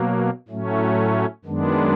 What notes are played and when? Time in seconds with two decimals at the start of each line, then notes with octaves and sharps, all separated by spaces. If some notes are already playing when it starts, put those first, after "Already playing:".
Already playing: B2 F#3 A#3
0.48 A2 F#3 A3 C#4
1.45 F#2 D#3 G#3 B3 D4